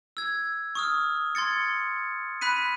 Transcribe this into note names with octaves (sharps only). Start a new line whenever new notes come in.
E6 G#6
C#6 D#6 F6
C6 G#6 A6 C#7
B5 F#6 B6 D#7